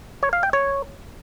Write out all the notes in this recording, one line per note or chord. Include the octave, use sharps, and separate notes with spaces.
C#5
F5
G5
C#5